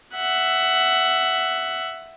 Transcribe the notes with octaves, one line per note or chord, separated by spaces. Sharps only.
E5 F#5